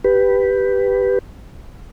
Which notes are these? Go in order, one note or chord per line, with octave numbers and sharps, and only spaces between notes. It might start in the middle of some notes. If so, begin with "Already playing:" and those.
G4 B4